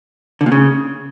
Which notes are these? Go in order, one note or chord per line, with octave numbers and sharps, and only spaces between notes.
D3
A#2
C#3